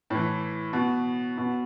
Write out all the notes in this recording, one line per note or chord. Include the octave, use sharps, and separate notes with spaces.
A2 E3
B2
B2